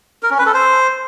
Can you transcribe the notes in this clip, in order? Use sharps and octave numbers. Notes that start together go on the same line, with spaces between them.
A#4
C#4
B4
A4
C5